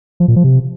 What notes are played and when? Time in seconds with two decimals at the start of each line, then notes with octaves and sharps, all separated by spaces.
0.20 F3
0.28 A#2
0.36 F3
0.44 C3